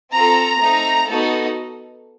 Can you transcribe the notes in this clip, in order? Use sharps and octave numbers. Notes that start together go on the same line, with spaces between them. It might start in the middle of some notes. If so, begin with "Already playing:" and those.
C4 F4 A4 A#5
A3 C4 D#4
B3 D#4 F#4 A4